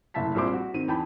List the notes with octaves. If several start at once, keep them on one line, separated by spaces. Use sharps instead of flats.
F#1 A2 E5 A5 B6
A#1 G3 C4 E4 C5 D6
F#4
D#3 C4 D#7
E2 G5 A5 B5